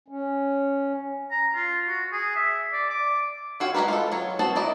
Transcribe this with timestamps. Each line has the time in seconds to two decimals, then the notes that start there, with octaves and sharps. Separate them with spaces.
0.08 C#4
1.31 A#5
1.55 F4
1.88 F#4
2.13 G#4
2.36 E5
2.73 D5
2.90 D6
3.60 F4 F#4 C#5 F5 G5
3.74 G#3 F#4 G4 A#4 B4
3.88 F4 A4
4.12 F#3 C#5
4.39 B3 C4 F#4 C5 A5
4.55 D#3 E4 D5 D#5